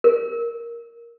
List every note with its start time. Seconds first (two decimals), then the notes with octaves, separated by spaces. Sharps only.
0.04 A#4